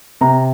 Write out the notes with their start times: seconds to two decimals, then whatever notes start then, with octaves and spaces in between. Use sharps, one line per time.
0.21 C3 A#5